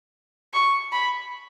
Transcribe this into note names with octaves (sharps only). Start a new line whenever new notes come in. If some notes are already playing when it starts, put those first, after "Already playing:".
C#6
B5